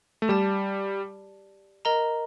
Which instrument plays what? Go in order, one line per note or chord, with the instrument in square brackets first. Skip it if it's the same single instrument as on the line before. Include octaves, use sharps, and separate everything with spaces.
[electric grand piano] A3
[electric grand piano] G3 [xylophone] G4 D5 A5
[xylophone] A#4 D#5 A#5